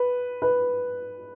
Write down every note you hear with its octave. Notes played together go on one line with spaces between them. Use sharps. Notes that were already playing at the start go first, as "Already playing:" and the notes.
Already playing: B4
B4